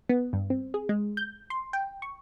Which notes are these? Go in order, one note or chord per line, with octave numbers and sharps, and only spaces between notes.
B3
G2
C4
G#4
G#3
G6
C6
G5
C#6